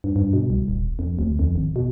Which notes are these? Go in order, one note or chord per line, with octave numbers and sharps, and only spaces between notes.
G2
G2
B2
C2
D#1
F2
D2
F2
G#1
B2